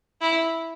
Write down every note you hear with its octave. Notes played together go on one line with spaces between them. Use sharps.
E4